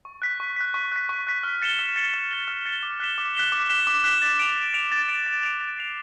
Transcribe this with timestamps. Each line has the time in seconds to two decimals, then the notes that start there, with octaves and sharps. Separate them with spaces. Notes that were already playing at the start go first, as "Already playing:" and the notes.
0.05 C#6
0.22 F#6 B6
0.40 C#6
0.56 F#6 B6
0.74 C#6
0.92 F#6 B6
1.09 C#6
1.27 F#6 B6
1.43 F6
1.62 A6 C#7 E7 G7
1.79 F6
1.96 A6 C#7 E7 G7
2.14 F6
2.31 A6 C#7 E7 G7
2.48 F6
2.66 A6 C#7 E7 G7
2.83 D6
3.00 F#6 B6 E7 G7
3.18 D6
3.35 F#6 B6 E7 G7
3.52 D6
3.70 F#6 B6 E7 G7
3.87 D6
4.04 F#6 B6 E7 G7
4.22 A6
4.39 D7 F7
4.56 A6
4.74 D7 F7
4.92 A6
5.09 D7 F7
5.26 A6
5.43 D7 F7
5.61 A6
5.78 C7 F7